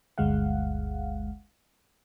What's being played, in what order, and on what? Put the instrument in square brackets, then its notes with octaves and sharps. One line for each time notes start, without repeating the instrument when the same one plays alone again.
[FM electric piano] G1 D2 G#3 F5 F#5